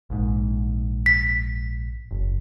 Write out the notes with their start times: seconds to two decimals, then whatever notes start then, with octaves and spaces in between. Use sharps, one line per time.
0.10 A#1 G#2
1.06 B6
2.11 F#1